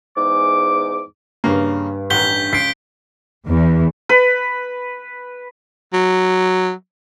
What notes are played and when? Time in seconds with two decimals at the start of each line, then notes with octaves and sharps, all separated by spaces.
0.17 E2 G#2 D6
1.44 G2 C#3 A#3
2.10 A1 D#3 F#5 G6 B6 G7
2.53 C#2 B6 C7 D7
3.46 E2
4.09 B4
5.93 F#3